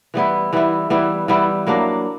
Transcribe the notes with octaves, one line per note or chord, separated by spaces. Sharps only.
E3 G3 B3 E4
E3 G3 B3 E4
E3 G3 B3 E4
E3 G3 B3 E4
F#3 A#3 D4